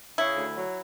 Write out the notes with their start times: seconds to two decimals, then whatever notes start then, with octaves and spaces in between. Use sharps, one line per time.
0.18 C#3 E4
0.36 D2
0.55 F#3